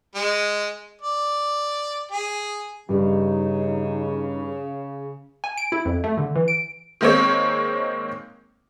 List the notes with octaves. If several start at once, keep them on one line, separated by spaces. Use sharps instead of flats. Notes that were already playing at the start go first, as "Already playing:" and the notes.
G#3
D5
G#4
G2 C#3 D#4
G#5
D7
E4
F2
A3
D3
E3
D7
D#3 G#3 A#3 C4 C#5